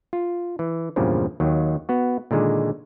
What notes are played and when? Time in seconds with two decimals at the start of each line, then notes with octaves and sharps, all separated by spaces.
0.13 F4
0.59 E3
0.96 E2 G2 A#2 C#3 F3
1.40 D#2 D#3 F#3
1.89 B3 F#4
2.31 A#2 D3 D#3 G#3